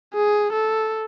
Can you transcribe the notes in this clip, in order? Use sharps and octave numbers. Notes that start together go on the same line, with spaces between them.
G#4
A4